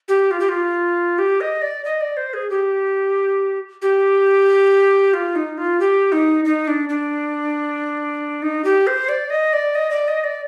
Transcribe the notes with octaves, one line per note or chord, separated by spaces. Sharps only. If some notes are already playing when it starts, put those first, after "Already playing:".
G4
F4
G4
F4
G4
D#5
D5
D#5
D5
C5
G#4
G4
G4
F4
D#4
F4
G4
D#4
D#4
D4
D4
D#4
G4
C5
D5
D#5
D5
D#5
D5
D#5
D5